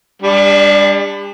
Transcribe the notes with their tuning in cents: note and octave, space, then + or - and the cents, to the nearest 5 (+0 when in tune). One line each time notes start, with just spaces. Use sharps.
G3 +40 D4 +0